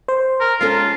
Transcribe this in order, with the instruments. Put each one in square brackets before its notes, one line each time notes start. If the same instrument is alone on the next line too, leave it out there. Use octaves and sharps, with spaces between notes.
[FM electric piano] C5
[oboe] A#4
[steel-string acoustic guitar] G#3 C#4 A4 [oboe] F4